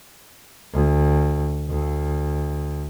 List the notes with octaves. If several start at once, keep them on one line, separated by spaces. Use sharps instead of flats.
D2
D2